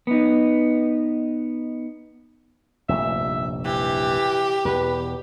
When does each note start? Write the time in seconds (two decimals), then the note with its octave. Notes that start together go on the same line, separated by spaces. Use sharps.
0.07 B3 D#4
2.89 F1 A#1 G2 E5
3.65 E3 G4
4.65 E2 B2 B4